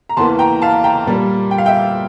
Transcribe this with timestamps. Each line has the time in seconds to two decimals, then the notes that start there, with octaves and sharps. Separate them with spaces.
0.09 A#5
0.17 E2 E3 A#3 A5 C6
0.39 G5 A#5
0.62 F5 A5
0.84 G5 A#5
1.07 A#2 G3 A#3
1.51 G5
1.58 F5
1.66 E5 G5